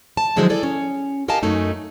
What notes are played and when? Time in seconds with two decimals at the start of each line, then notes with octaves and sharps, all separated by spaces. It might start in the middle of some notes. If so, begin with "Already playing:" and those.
0.17 A5
0.36 D3 F3 F#3 G#3 E4 C5
0.49 G#4 A4 D5
0.63 C#4
1.28 G4 A#4 D#5 F5 G#5 A5
1.43 F#2 F#3 G#3 A3 D#4